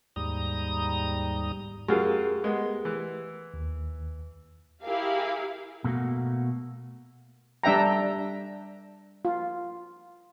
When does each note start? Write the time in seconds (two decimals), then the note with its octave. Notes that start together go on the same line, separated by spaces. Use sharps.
0.16 D#2 G#2 G3 A#5 D#6
1.88 F#2 F4 G4 G#4 A#4
2.44 G#3 B3
2.85 E3
3.54 D#2
4.83 E4 G4 G#4 A#4 F5
5.84 B2 A3 A#3 F#4
7.63 G3 D4 E5 G5 A#5
9.25 F4